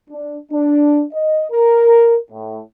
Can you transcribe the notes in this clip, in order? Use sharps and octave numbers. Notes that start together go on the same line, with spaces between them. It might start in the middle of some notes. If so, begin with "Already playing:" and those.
D4
D4
D#5
A#4
A2